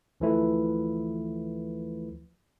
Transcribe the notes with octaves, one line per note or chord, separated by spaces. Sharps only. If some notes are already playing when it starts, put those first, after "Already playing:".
D2 E3 F3 A3 E4 B4